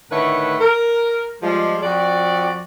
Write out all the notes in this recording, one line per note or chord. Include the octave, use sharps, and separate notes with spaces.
A2 D3 D#3 A3 B4 C#5
A#4
F3 G3 G#3
F2 F3 F#4 D5